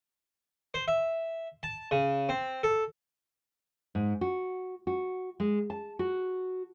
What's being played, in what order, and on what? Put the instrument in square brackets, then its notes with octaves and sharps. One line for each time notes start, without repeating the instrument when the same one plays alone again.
[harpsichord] C5
E5
A5
C#3
C4
A4
[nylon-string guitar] G#2
F#4
F#4
G#3
A5
F#4